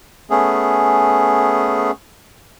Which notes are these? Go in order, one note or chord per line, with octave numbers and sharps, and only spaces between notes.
A3 B3 C#4 G#4